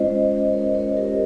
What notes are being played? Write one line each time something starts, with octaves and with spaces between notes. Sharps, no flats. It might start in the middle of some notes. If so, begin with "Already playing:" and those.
Already playing: G#3 C#4 F4 C5 D#5
A#4 C#5
A#4 C#5
G4 A#4